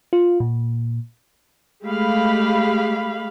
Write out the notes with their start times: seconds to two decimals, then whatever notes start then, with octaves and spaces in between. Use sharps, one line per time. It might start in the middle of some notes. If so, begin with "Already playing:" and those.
0.13 F4
0.40 A#2
1.84 G#3 A3 G4 F5 B5